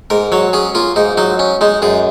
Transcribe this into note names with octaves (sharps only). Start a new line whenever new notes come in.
G#2 A#4
F#3 C#5
C#4 G#4
A#3 F4
G#2 D#4
F#3 D#4
C#4
G#3 D#4
F#2 G#4